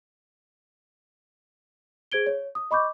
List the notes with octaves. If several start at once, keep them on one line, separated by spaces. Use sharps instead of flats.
G#4 C5 G#6 D7 G7
C#5
D#6
D#5 B5 C#6 D6 G6